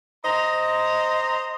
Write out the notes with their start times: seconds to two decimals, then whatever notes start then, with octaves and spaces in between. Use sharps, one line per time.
0.24 C5 D#5 A#5